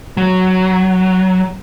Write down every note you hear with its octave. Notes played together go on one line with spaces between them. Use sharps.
F#3